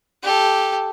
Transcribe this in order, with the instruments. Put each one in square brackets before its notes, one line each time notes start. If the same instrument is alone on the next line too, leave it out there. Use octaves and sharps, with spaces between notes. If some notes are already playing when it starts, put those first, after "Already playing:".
[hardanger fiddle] G4 A4